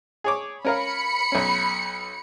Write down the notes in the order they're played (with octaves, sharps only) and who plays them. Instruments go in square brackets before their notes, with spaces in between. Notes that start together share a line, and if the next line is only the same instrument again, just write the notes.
[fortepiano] G#4 C#5 D6
[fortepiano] C#4 A#4 F5 [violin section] B5 C#7
[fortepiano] B1 C#4